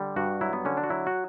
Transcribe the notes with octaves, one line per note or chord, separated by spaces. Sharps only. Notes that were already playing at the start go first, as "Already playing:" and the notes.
Already playing: D3 G3
G2 F#4
F#3 E4
B3
D3 C#4
D4
F#4
F#3 E4
F#4